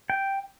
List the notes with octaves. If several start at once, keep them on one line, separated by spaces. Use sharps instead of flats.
G5